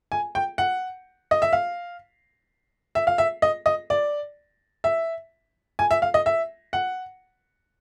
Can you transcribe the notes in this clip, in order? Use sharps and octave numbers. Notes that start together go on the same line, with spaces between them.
G#5
G5
F#5
D#5
E5
F5
E5
F5
E5
D#5
D#5
D5
E5
G#5
E5
F5
D#5
E5
F#5